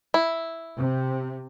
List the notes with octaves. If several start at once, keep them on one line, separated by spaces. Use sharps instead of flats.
E4
C3